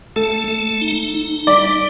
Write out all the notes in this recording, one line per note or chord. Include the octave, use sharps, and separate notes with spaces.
A3 A4
A3
D#4
D#4
G3 D5